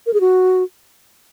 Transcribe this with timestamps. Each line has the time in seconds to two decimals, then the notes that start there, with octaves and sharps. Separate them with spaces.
0.06 A#4
0.14 G#4
0.21 F#4